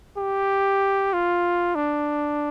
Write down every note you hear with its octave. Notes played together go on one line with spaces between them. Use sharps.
G4
F4
D4